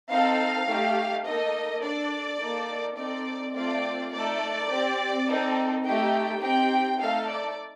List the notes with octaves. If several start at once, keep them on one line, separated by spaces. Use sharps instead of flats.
C4 D#4 A4 F5
A3 D#4 G4
A#3 D#4 A4 D#5
D4 A4 D5
A#3 D#4 A4
C4 D#4 A4 D5
A3 C4 F4 A4 D5
A3 D#4 A4 D5
C4 G4
C4 D#4 A4
A3 D#4 G4 G5
C4 D#4 G4 G5
A3 D#4 A4 F5
D5